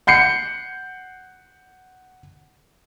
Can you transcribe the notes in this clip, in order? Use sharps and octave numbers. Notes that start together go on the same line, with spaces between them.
F#5 G6 C7 C#7